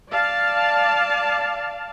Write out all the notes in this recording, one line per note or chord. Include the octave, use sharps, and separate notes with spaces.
D5 F5 A5